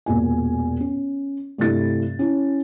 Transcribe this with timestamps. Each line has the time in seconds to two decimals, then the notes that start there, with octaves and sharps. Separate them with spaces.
0.06 E1 A#2 G#5
0.80 C#4
1.58 G2 C3 G3 A3 E4 A6
2.19 C#4 E4